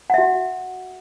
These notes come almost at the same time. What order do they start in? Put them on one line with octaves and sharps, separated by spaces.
F#5 E5 F#4